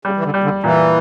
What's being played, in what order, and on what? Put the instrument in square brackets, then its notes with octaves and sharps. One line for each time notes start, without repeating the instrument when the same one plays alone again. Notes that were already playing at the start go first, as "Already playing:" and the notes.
[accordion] C#3 [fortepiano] G3
[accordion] E3
D3
[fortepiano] G3
[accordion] D3
[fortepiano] A#2 [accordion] E3